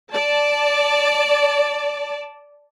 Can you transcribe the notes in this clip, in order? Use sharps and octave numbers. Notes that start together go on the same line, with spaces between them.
D5 A5